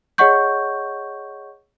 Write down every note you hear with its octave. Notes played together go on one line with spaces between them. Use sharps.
G#4 C#5 D#5 F#5 C#6 G6